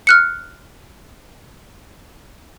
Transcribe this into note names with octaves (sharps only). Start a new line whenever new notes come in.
F6 F#6 C#7